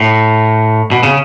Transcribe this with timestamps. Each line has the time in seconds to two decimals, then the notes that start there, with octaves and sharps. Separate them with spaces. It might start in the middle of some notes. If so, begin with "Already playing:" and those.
Already playing: A2
0.92 B2
1.03 C#3